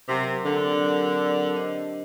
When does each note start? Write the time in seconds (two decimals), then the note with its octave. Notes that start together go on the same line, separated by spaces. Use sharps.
0.07 C3 F#3 C4 G4 A#4
0.45 D3
0.81 F#3 C4 G4 A#4
1.56 D4 G4 C5 D#5